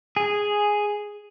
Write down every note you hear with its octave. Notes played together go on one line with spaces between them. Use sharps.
G#4